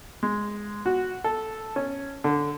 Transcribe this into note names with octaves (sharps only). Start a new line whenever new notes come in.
G#3
F#4
A4
C#4
D3